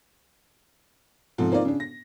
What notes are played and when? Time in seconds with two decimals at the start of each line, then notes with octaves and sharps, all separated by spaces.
1.38 G#2 C3 F3 A4
1.52 A#3 C4 D#4 F4 D5
1.65 C#3 D4
1.80 A#6